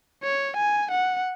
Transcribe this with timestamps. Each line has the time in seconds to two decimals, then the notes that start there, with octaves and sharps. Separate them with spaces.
0.23 C#5
0.56 G#5
0.91 F#5